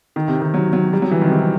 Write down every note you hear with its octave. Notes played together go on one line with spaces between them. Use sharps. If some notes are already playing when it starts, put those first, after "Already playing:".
D#3
C3
D#3
F#3
F#3
G3
F#3
E3
D#3
C3
D#3